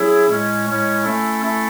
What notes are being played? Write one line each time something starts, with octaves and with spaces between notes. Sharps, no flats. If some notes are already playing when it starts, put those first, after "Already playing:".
Already playing: F#3 C#4 E4 G#4
A2 G#3 C#4
A2 G#3 C#4
A3 C#4 E4 A4
A3 C#4 E4 A4